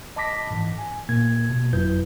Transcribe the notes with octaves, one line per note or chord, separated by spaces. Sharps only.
D#5 A5 B5 D6 A#6 B6
G#2 E3
G#5
A#2 A#3 G#6
B2
G1 F2 F#3 E4 B4 G6